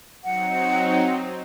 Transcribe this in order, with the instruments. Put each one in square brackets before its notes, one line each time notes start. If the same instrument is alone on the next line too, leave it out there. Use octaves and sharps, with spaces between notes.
[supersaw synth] F#3 C4 D#4 [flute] F#5